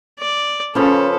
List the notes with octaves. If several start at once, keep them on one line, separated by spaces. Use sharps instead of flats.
D5
C#3 F3 C#4 A4 B4